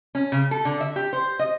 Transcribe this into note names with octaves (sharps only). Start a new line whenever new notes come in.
C#4
C#3
A4
D3
E5
G4
C5
D#5